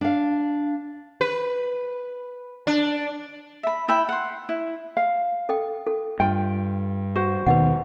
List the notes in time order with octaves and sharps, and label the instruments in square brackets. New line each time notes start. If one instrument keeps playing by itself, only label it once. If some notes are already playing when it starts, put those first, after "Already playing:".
[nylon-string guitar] D4 F5
[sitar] B4
D4
[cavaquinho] E5 B5
E4 E5 G5 B5
F#5 C6
E4
[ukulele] F5
[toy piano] A4 D#5 G5
A4
[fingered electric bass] G2 [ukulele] F4 G5
[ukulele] F#4 C5
[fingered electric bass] D#2 B2 D#3 [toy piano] B4 D#5 F#5